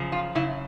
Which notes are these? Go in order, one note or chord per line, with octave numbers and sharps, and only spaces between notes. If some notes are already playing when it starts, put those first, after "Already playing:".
Already playing: F#2 C#3 F3
F4
F#2 C#3 E4